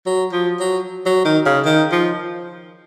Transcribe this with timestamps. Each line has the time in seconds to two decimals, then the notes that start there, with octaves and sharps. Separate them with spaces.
0.06 F#3
0.33 F3
0.60 F#3
1.06 F#3
1.25 D#3
1.46 C#3
1.65 D#3
1.92 F3